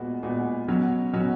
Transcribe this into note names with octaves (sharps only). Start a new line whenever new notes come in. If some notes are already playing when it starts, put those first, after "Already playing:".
Already playing: A#2 G#3 B3 F#4
A#2 G#3 B3 F#4
B2 F#3 C#4 F#4
B2 F#3 C#4 F#4